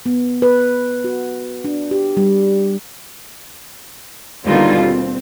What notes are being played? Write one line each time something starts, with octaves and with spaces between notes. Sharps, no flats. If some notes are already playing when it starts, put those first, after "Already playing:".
B3
B4
F#4
D4
G4
G3
D#2 B2 D3 G3 D#4 F4
C4